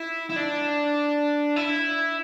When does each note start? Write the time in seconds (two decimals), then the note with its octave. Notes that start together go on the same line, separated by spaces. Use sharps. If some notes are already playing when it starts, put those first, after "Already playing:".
Already playing: E4
0.29 E4
0.36 D4
1.56 E4